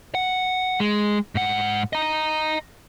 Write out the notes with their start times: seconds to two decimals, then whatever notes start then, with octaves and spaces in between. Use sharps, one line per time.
0.15 F#5
0.80 G#3
1.35 G#2 F#5
1.93 D#5 A#5